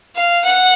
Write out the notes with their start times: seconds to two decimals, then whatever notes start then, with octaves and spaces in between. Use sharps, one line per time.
0.15 F5
0.44 F#5